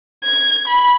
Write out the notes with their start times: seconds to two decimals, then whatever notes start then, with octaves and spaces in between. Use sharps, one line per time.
0.24 G#6
0.67 B5